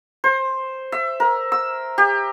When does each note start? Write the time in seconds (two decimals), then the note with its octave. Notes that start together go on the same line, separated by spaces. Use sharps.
0.24 C5
0.92 E5
1.20 A#4
1.52 E6
1.98 G4